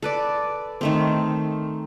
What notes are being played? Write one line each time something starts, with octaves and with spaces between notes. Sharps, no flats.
A4 B4 D5
D#3 A3 C4